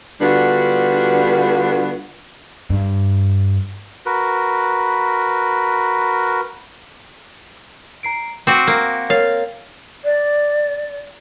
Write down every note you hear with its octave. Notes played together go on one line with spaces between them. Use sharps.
D3 G3 B3 D4 F4 F#4
G2
F#4 A#4 B4
A#5 C7 D7
C4 F#4 D6
A#3
A#4 C#5 F5 A6
D5